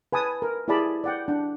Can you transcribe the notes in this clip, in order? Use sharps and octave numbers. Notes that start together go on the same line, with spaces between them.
B4 G#5 A5 D#6
A#4
E4 G4 G#4 D5 A5 B5
D5 F#5 G5
D4 F#5